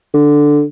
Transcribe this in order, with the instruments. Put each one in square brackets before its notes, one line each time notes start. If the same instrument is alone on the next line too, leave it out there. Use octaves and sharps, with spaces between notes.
[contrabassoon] D3